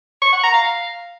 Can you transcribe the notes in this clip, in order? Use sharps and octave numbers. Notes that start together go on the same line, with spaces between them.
C#6
F#5
A#5
F5